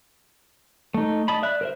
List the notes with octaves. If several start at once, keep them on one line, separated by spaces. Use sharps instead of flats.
A3 D#4
D#5 A5 B5
D5 E5 F#6
A#4 C5 E5